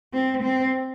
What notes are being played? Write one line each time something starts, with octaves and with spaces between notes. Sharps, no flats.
C4
C4